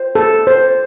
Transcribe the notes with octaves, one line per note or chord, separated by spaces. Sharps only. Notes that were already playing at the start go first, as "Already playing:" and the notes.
Already playing: C5
A4
C5